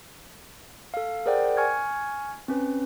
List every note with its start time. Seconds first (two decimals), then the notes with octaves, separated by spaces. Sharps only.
0.94 A4 F5
1.26 G#4 A#4 C5 D5 F#5 G5
1.57 G#5 C#6 F6 G#6
2.48 C4 C#4 B4